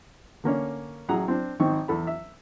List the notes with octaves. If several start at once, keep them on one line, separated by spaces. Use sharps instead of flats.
D3 A#3 C#4 C#5
A1 F#3 G#4 F#5 A#5
C4 D4
G#1 D#3 C4 C#6
E2 A4 B5
E5